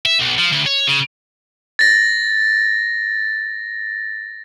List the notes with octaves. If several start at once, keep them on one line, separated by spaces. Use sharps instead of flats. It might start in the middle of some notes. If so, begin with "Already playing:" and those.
E5
B1
F3
D2
C#5
C#3
A6 A#6